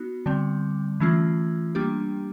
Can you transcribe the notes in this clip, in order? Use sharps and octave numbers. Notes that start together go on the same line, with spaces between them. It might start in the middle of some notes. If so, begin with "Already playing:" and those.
Already playing: B3 D#4 F#4
D3 G3 C4
E3 A3 C#4 F4
G3 A#3 D4 G4